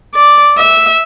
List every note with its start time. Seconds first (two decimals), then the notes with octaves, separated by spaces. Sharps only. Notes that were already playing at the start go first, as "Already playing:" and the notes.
0.15 D5
0.59 E5